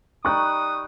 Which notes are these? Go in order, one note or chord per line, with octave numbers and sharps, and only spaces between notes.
G3 D#4 C#6 D#6 F#6